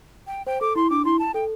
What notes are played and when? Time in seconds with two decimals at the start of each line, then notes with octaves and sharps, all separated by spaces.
0.27 G5
0.47 C5 G5
0.61 A4 D6
0.76 E4 C6
0.90 D4 D6
1.05 E4 C6
1.19 A5
1.34 A4 G5